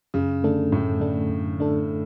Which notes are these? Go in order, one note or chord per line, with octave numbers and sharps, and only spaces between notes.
F#2 C#3
D3 A3 D4 A4
F#2 A2
D3 A3 D4 A4
F#2
D3 A3 D4 A4